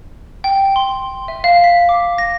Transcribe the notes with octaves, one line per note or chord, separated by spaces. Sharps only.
G5
C6
E5
F5
B6
D6
A#6